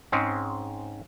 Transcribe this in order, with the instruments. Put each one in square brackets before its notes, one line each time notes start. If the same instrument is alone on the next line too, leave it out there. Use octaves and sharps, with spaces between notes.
[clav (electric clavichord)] G#2 G#3 C4 C#4